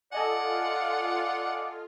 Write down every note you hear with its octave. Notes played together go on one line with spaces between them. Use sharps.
F4 A4 D5 D#5 F#5 G#5